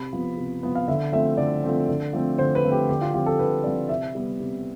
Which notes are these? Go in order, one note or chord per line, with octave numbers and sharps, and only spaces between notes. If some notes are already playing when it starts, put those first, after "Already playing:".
Already playing: C3 B5
F3 B3
C3
F3 B3
F5
D3 E5
F3 A3 C4 E5
D3 D5
F3 A3 C4
D3
F3 A3 C4
D3 C5
B4
F3 A3 C4
G4
D3 G4
F4
F3 C4 G4
A4
D3 B4
F3 C4 D5
C3 E5
G3 B3
C3